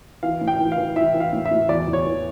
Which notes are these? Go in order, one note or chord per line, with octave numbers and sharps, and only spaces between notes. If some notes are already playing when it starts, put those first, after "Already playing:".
E3 F5
A2
G5
E3
F5
E3
E3 E5
E3
F5
A2
E5
A2
E2 D5
E2
C#5
E3